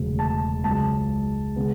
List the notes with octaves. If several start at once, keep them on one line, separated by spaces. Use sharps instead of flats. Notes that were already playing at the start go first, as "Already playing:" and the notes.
Already playing: E1 D2 C#3 F#3
A5
C#2 C#3 F#3 A5
C#3 G#3 B3